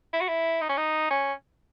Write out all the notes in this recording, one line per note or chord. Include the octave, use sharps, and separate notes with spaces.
E4
F#4
E4
D#4
C#4
D#4
C#4